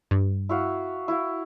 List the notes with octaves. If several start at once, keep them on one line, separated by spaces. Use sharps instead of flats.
G2
E4 F#4 F5
E4 F#4 F5